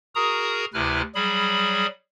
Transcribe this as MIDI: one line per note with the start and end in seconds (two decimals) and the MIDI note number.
0.15 0.65 66
0.15 0.65 68
0.15 0.65 70
0.15 0.65 82
0.15 0.65 87
0.74 1.02 38
0.74 1.02 48
0.74 1.02 64
0.74 1.02 71
0.74 1.02 89
1.15 1.86 54
1.15 1.86 55
1.15 1.86 68
1.15 1.86 83